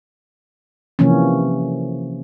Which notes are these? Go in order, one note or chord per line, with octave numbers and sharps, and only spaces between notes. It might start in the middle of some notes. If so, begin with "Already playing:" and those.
C3 E3 F3 A#3 C#4